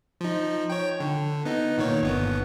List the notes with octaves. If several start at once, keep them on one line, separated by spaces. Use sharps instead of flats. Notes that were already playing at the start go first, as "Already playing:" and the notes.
F3 D#4
C#5 G5
D3
B3 D#4
A#2 D#3 C#5
G1 B3